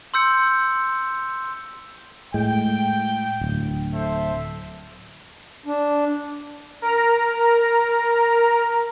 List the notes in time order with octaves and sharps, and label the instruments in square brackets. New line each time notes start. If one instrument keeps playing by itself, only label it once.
[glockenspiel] C6 E6 G6 C#7
[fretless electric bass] A2 G#3 [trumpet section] G5
[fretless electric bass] D1
[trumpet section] A4 C5 E5
[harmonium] D4
[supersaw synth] A#4 A#5